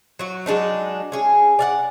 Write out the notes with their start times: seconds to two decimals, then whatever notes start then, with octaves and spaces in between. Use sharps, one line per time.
0.19 F#3 F#4
0.46 F#3 G#3 D4 D#4
1.12 C#4 G#4
1.59 D5 F5 F#5